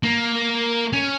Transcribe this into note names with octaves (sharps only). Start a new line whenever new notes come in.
A#3
C#4